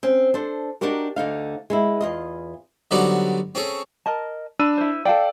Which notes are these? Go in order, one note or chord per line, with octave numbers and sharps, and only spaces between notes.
C4 C#4
D4 A4 C5
D4 D#4 F#4 G4 A#4
D2 D3 D#4 F5
G#3 B3 E4
E2 F4 D#5
D3 F#3 G3 B3 C4 D#4
C4 C#4 G#4 A4
A#4 D#5 A5
D4 B5 E6 D#7
E4 C5
A4 D5 F5 G5